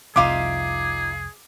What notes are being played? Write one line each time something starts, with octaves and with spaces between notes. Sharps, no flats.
F1 C2 D#4 F4 G#4 E5 D6